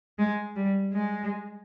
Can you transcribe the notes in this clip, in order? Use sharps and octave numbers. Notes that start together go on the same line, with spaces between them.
G#3
G3
G#3